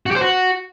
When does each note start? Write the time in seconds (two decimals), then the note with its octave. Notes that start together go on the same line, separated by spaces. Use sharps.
0.06 F#4
0.11 G4
0.16 C5
0.21 F#4